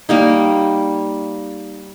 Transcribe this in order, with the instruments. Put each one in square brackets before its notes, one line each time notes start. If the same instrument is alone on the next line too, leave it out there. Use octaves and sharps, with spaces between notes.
[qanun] G3 A#3 D#4